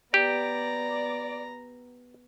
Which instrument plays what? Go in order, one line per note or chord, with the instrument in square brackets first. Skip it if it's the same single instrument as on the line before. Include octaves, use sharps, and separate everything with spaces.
[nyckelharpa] B3 A#5 [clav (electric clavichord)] G4 [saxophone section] D5